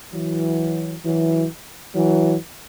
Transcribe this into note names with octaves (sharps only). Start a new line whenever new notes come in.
E3 F#3
E3 F#3
E3 F#3